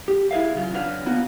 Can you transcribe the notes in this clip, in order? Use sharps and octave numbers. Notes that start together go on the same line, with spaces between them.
G4
E4 G#4 C5 E5 F5
C#3 F#3 D#4 F4
C#3 F#3 D4 B4 F5
D3 A#3 B3 F4 F#4